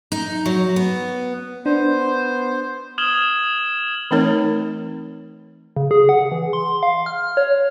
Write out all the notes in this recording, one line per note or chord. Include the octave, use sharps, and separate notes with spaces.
D#4
F#3
B3
B3 D4 C5
D#6 F6 G#6 E7 F#7 G7
E3 A3 C4 D#4 A#4 C#5
C#3
G#4
F#5
E3
C6
F5
F6
C#5